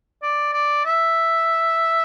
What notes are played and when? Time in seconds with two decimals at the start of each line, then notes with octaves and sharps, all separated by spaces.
0.22 D5
0.53 D5
0.85 E5